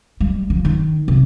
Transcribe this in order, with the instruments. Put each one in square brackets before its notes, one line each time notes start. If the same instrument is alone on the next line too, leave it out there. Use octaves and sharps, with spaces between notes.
[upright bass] G3
F3
D#3
C3